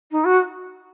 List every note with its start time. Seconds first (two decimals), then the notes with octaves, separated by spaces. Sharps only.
0.11 D#4
0.24 F#4